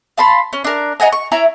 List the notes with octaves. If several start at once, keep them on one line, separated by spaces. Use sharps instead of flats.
F5 A5 B5 C6
C#4
D4 A#4
D#5 F#5 G#5 A#5
C#6
E4 C#5 A#5